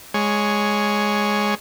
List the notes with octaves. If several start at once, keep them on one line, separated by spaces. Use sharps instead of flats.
G#3 C#5